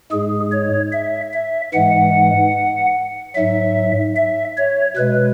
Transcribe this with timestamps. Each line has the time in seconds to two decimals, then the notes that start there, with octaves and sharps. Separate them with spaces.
0.12 G#2 G#3 G#4
0.52 C#5
0.93 E5
1.34 E5
1.73 G#2 E3 G#3 F#5
3.35 G#2 F#3 E5
4.16 E5
4.57 C#5
4.97 B2 G#3 B4